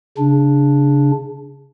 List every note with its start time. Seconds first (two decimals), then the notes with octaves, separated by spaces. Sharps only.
0.18 C#3 D4